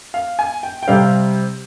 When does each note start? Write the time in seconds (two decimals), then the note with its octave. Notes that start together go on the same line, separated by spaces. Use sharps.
0.14 F5
0.39 G#5
0.63 G5
0.83 G5
0.88 C3 G3 C4 F5